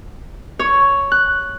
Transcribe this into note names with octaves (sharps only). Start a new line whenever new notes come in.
C#5
F#6